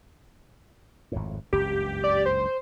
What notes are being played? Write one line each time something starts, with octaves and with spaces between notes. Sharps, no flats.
G#1 F2 A2
F#1 C#2 G2 G4
D5
C5